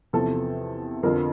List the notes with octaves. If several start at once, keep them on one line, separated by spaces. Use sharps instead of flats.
E2 C3 F3 A4
F2 D3 F3 A#4